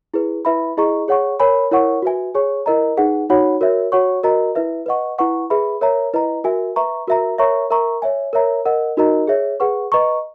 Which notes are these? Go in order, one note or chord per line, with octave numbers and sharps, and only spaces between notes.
E4 G#4 B4
E4 B4 E5 B5
E4 G#4 D#5 A#5 C#6
G#4 C#5 F#5 C#6
A#4 C#5 G#5 B5
E4 A#4 C#5 F#5 C#6
F#4 B4 E5 G#5
G#4 C#5 G#5 C#6
E4 A#4 D#5 A#5
D#4 G#4 B4 F#5
D#4 F#4 C#5 F#5 B5
F#4 A#4 C#5 E5
F#4 C#5 F#5 C#6
F#4 A#4 D#5 A#5
E4 B4 E5
B4 D#5 F#5 C#6
E4 B4 F#5 C#6
G#4 B4 E5 B5
A#4 C#5 E5 A#5
E4 B4 D#5 A#5
F#4 A#4 E5 G#5
B4 E5 A#5 C#6
F#4 A#4 E5 A#5
A#4 C#5 E5 A#5 C#6
A#4 E5 A#5 C#6
C#5 E5 G#5
A#4 C#5 E5 A#5
A#4 D#5 F#5
D#4 F#4 A#4 D#5 A#5
G#4 C#5 E5
G#4 B4 F#5 C#6
B4 D#5 A#5 C#6